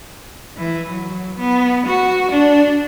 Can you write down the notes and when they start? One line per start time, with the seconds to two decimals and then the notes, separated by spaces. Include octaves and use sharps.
0.57 E3
0.89 F#3
1.39 B3
1.86 F#4
2.31 D4